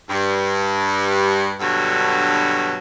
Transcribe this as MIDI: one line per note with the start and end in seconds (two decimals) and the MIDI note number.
0.10 1.55 43
1.60 2.78 43
1.60 2.78 47
1.60 2.78 50
1.60 2.78 54